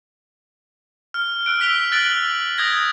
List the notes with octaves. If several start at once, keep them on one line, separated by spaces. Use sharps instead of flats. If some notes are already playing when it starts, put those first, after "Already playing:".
F6
E6 F#6 D7
E6 B6 D7 F7 G7
F#6 A6 D7 F#7
D#6 G6 G#6 A#6